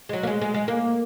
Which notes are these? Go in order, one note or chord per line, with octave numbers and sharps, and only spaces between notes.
G#3
F#3
A#3
G#3
G#3
G#3
A#3